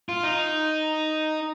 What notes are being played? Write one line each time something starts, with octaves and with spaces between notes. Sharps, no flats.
F4
D#4